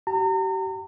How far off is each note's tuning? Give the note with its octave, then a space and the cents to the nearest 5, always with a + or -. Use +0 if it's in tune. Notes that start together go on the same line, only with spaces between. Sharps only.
G4 -40 A#5 -35